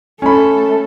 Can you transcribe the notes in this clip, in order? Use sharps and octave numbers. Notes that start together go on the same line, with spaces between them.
A3 C#4 A4 B5